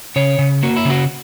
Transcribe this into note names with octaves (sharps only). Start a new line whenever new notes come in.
C#3 C#5
C#3
A#3 F#4
E4
C#3
F#4